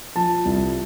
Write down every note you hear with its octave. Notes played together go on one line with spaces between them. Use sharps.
F3 A5
C2